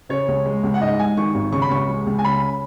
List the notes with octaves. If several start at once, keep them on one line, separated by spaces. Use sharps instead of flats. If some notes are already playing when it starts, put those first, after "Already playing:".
C#3 C#5
C#2
G#3
C#2
F#5
G#2 D#5
G#3 G#5
D#3 C#6
G#1
C#3 C#6
B5
C#2 C#6
G#3
C#2
G#5
C#3 B5